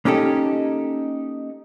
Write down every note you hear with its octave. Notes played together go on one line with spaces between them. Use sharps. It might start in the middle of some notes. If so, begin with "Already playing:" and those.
A#3 C#4 D#4 G4 A4